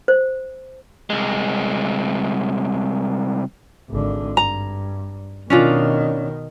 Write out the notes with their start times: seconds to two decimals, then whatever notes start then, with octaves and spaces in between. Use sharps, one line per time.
0.08 C5
1.10 C2 G#3
3.90 G#1 D3
4.37 G2 A#5
5.50 B2 D#3 C#4 D4 F4